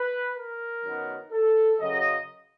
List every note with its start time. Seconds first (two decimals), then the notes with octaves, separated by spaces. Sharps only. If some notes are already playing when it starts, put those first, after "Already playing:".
Already playing: B4
0.36 A#4
0.84 F#2 D#3 F#3 B3
1.33 A4
1.80 F#2 C#3 F#3 D#5